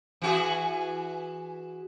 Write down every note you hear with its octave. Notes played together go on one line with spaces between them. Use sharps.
E3 F#4 G#4